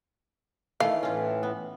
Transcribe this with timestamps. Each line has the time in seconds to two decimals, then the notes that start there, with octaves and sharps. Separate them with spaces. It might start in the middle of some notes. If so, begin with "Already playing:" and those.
0.80 D#3 E3 A3 F5
1.03 A2 E3 C#4 F4
1.43 B3